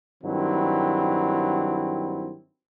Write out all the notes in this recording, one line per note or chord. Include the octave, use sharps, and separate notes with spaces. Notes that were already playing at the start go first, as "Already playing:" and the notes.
G2 D#3 F#3 C4 E4